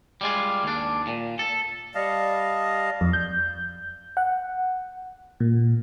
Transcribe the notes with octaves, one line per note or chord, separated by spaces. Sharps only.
G3 G#3 F4
D#2 D4
A#2
A4
G3 D#5 F5 A5
F2
G6
F#5
A#2